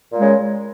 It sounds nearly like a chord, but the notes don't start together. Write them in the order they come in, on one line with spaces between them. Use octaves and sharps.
A#2 G#3 C#3